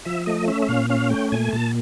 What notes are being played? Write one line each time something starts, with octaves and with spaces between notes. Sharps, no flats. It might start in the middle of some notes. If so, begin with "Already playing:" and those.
F3 E5
A3 D#5
C#4 E5
E5
A#2 F5
C#4 F5
A3 G5
A#2 G#5
A#2 A5